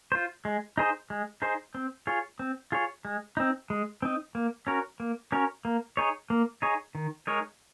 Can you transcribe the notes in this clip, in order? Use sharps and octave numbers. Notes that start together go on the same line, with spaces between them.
F4 C5
G#3
D#4 G#4 C5
G#3
D#4 G#4 C5
C4
F4 G#4 C#5
C4
F4 G#4 C#5
G#3
C4 D#4
G#3
C4 D#4
A#3
C#4 F#4 A#4 C#5
A#3
C#4 F#4 A#4 C#5
A#3
D#4 G#4 C#5
A#3
D#4 G#4 C#5
D#3
G#3 D#4 A#4 C#5